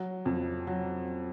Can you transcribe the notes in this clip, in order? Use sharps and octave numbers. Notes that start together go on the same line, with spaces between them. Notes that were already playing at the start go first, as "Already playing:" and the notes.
Already playing: F#3
F2
F#3